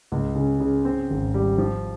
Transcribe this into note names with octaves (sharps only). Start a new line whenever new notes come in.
C#2
C#3
C#3
C4
G#1
G3
F3